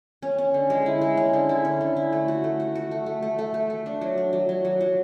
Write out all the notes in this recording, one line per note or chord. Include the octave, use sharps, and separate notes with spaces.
C#4
C#4
D3
G#3
E4
G#3
C#4
D3
E4
C#4
D3
E4
A3
F#4
A3
F#4
F#4
A3
A3
A3
A3
A3
A3
D4
F#3
D4
F#3
F#3
F#3
F#3